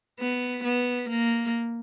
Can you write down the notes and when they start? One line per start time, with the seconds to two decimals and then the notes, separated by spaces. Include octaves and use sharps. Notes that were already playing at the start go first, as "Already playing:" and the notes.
0.19 B3
0.64 B3
1.10 A#3